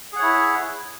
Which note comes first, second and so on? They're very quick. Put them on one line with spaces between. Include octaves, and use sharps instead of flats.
G#4 F#5 C#5 E4